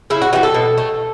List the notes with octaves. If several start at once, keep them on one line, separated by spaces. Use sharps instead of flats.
C#3 E4
F#4
E3 G3 F#4
A4
B2
A3